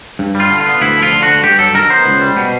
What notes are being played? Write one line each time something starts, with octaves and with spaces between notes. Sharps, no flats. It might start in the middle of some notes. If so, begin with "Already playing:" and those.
G2
G3
F4
D3
F4
B3
D2 E4
F3
F4
D3
F#4
D2
G2 G4
F#3 A4
D#3 A#4
B3 C5
C#2
G3
B2